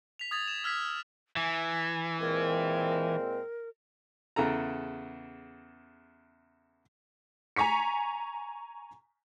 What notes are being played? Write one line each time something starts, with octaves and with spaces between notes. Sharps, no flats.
B6 F7
D#6 G#6 A6 F7
E7
E6 F6 G#6 B6
E3 G#5
A#2 G#3 C4 A#4
E2 C#3 A4 A#5
G#5 A#5 C#6 B6 C#7